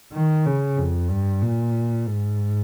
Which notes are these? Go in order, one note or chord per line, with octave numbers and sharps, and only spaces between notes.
D#3
C#3
F2
G2
A#2
G#2